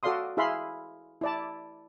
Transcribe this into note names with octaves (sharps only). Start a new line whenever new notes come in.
F#4 A4 D5 F5 C6 D#6
E4 G#4 E5 F5 B5 C6
E4 D5 A5